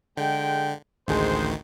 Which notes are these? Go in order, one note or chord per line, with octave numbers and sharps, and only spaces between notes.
D3 G#3 G5
A1 D2 D#3 G#3 G#4 C5